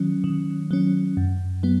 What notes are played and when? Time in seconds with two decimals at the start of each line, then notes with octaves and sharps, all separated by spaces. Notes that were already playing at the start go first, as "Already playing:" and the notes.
Already playing: D#3 F#3 C#4
0.24 D#3
0.71 F#3 C#4
1.17 F#2
1.63 F#3 B3